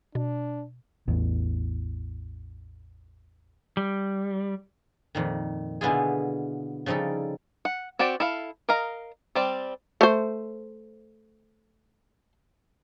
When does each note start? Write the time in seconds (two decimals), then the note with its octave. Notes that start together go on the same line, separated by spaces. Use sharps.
0.15 B2 D4
1.08 A1 E2
3.77 G3
5.15 F2 A#2 D#3
5.81 B2 D3 B3 E4 F4 G#4
6.86 C#3 F3 G3 D#4 A4
7.65 F#5
7.99 C4 F#4 G4 D5
8.20 E4 A4 F5
8.69 A#4 D#5 F5 A#5
9.35 G3 C4 D5
10.01 A3 C5